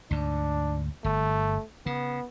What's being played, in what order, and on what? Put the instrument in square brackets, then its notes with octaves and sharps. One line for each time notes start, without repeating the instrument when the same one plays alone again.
[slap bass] D2 G#2 [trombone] D4
[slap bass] G1 [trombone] A3
[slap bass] C#3 [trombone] B3